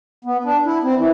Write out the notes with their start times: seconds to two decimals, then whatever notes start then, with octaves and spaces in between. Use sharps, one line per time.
0.25 B3
0.44 D4
0.66 E4
0.84 C4
0.96 E3